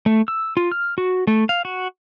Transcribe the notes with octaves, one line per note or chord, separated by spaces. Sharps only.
A3
E6
F4
F6
F#4
A3
F5
F#4